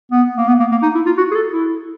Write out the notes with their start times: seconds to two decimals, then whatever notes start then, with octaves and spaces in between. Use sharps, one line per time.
0.11 B3
0.37 A#3
0.47 B3
0.60 A#3
0.71 A#3
0.82 D#4
0.95 E4
1.06 F4
1.17 F#4
1.31 G#4
1.35 A4
1.53 E4